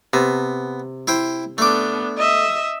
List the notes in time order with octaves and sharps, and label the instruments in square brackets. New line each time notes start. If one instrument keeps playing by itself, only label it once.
[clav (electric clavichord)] C3 [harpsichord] B3
[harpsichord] E4 C5 G5
[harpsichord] A3 D6 [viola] B3 D4
[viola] D#5 E5